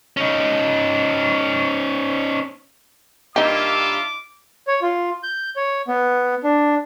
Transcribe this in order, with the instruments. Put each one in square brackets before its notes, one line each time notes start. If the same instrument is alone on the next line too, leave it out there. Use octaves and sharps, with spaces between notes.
[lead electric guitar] C#4 D#4
[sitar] G2 A#3 [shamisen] D#4 G4 [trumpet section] F4 E5 [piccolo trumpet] D6
[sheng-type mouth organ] C#5
F4
G6
C#5
B3
D4